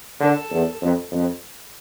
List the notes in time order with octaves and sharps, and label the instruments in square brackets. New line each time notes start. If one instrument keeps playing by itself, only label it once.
[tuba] D3 [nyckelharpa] A4
[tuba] E2
F2
F2